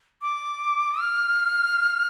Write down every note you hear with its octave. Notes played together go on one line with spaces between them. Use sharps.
D6
F6